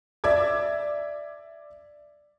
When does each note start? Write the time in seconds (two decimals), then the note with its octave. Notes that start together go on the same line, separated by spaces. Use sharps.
0.24 D5 E5 D6 G#6